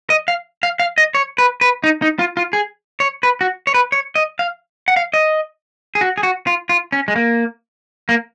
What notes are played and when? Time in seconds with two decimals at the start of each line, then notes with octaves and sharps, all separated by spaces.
0.10 D#5
0.28 F5
0.63 F5
0.80 F5
0.98 D#5
1.15 C#5
1.38 B4
1.61 B4
1.84 D#4
2.02 D#4
2.19 F4
2.37 F4
2.53 G#4
3.00 C#5
3.23 B4
3.41 F#4
3.67 C#5
3.74 B4
3.92 C#5
4.15 D#5
4.39 F5
4.88 F#5
4.97 F5
5.14 D#5
5.95 G#4
6.01 F#4
6.18 G#4
6.23 F#4
6.47 F4
6.69 F4
6.92 C#4
7.08 G#3
7.16 A#3
8.09 A#3